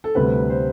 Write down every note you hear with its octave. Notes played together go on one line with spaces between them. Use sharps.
A4
D2 C3 G3 B4
C5